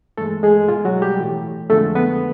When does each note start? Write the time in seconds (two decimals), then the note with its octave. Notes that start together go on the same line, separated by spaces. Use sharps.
0.18 G2 E3 G#3 A3 A4
0.43 G#3 G#4
0.68 B2 G#3 F4
0.85 F#3 F#4
1.02 G3 G4
1.19 A2 E3 A3
1.70 F2 D3 F3 G#3 A3 A4
1.95 B3 B4